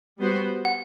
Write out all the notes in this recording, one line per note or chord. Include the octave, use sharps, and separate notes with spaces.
G3 B3 F#4 C5
F#5